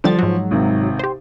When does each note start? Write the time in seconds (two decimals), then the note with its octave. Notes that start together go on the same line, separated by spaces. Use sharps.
0.04 D3 F3 G3 A6
0.19 G#2 F#3
0.51 G#1 C3
0.99 G4 C5